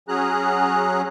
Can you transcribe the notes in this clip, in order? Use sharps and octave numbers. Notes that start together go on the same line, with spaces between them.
F#3 C#4 G#4 A#5 F#6